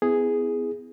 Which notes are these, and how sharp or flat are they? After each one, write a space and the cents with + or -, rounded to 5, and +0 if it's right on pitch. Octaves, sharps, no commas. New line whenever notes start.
B3 +35 E4 -5 G#4 +0